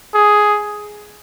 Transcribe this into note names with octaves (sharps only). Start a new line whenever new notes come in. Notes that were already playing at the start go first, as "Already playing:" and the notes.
G#4